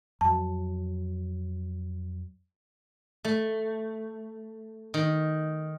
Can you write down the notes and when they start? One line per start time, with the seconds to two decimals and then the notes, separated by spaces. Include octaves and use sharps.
0.21 F2 F#3 A5
3.25 A3
4.94 D#3